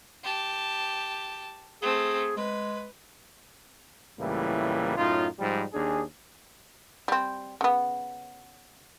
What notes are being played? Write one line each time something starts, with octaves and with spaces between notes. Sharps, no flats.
G4 A5
A3 C4 G#4
G#3 B4
C#2 A2 E3 G3 A#3
F#2 A2 D#4 F4
G#2 F3 G3
D#2 D4 G#4
G3 C4
C#3 B3